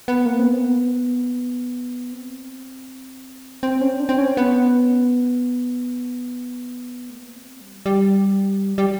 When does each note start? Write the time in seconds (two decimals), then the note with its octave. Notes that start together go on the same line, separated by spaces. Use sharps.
0.08 B3
0.26 A#3
0.39 C4
0.45 B3
2.12 C4
3.63 C4
3.81 C#4
4.00 D4
4.09 C4
4.18 C#4
4.37 B3
7.10 A3
7.18 A#3
7.27 B3
7.36 C4
7.61 G3
7.86 G3
8.78 G3